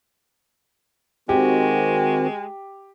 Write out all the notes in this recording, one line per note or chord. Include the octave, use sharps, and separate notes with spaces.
D#3 G#3 C4 F#4 G4